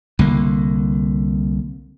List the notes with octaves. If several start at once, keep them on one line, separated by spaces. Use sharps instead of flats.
C2 D3 A#3